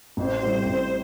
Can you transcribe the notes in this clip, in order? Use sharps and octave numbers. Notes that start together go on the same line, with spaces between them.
A1 C5
A2 G3 C4 F#4
A1